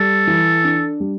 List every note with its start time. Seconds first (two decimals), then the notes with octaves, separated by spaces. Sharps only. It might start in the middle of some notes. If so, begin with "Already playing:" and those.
Already playing: G3 A4
0.27 E3
0.64 D4
1.00 G3